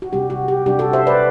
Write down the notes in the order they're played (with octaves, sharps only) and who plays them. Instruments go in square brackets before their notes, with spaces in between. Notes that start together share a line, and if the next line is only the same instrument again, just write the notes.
[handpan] F#4
C3 G3 D4 G4
F#4
G4
C3 G3 D4 G4
F#4 A4
C5 E5
B4 D5